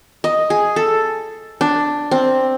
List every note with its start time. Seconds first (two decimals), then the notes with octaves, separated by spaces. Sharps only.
0.24 D#5
0.50 G#4
0.76 A4
1.61 D4
2.11 C4